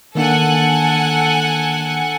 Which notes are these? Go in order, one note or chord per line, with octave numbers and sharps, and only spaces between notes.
D#3 A#3 D4 A4 F#5 G#5